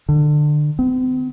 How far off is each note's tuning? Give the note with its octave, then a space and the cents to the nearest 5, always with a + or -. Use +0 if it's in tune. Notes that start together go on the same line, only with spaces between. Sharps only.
D3 +25
C4 -45